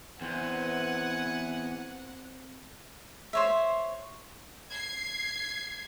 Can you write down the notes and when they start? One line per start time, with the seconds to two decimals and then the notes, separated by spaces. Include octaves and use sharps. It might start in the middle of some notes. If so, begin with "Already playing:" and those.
0.21 E2 C4 B4 F#5 G#5
3.33 C5 C#5 E5
4.71 G#6 C7